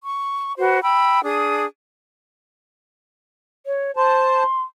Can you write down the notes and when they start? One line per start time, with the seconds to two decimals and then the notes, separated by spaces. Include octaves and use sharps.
0.05 C#6
0.58 F#4 B4 C5
0.82 G5 B5 E6
1.24 D4 G#4 D#6
3.66 C#5
3.97 C5 A5 C6